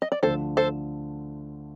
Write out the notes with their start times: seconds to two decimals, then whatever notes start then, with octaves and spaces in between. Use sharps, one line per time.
0.02 D#5
0.12 D5
0.23 D2 D3 F3 A3 A4 C5
0.57 A4 C5